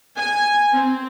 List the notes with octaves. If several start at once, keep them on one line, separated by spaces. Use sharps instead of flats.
G#5
C4